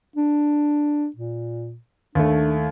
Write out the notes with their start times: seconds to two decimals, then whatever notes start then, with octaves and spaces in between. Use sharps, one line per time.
0.16 D4
1.16 A#2
2.15 D#2 A3 D4